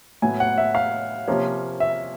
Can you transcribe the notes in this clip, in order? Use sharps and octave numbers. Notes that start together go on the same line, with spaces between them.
A2 F#3 B3 G#5
F#5
E5
F5
C3 F3 A#3 C#4
E5